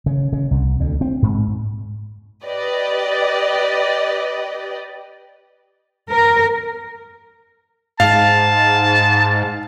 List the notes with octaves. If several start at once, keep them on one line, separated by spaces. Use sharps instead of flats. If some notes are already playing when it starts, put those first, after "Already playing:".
C#3
C#3
C2
D2
C4
G#2
G4 B4 D5 D#5
A#4
G#2 F5 A5